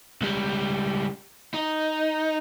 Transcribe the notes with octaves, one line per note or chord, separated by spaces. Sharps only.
C#2 G3
D#4